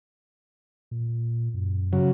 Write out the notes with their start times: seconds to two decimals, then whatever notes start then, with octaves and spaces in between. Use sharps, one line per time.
0.91 A#2
1.54 F#2
1.93 C#3 F#3